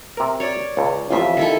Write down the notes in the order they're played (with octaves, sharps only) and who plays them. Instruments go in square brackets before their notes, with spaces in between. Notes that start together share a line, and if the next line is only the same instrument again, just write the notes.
[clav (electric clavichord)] C3 A#4
[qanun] C#5 D5
[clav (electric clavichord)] C#2
[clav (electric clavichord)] A1 F2 [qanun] F3 E5
[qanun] D#3 E4 A4